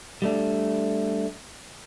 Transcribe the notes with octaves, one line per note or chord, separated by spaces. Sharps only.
G3 A3 D4